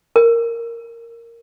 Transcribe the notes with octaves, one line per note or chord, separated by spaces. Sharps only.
A#4